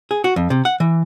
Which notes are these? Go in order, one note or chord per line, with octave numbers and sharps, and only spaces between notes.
G#4
F#4
F2
C3
F#5
E3